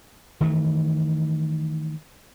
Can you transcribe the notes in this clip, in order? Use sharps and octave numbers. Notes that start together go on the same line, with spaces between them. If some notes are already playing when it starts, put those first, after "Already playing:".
D#3 E3 A3